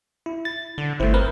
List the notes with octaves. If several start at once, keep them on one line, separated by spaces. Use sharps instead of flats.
E4
A6
D3
G1 A3 C4 E4
C4 A#4 B4